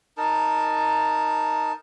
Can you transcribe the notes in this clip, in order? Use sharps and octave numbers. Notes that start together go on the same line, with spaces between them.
D#4 A#4 A5